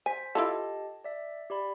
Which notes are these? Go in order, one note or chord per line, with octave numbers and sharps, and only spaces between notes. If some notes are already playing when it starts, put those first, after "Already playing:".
C5 G#5 B6
E4 F4 G4 A4 D#5 A5
D5 E5
G4 D5 B5